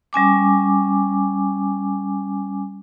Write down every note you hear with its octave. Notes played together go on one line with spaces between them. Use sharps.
G3 C#4 G#5 D6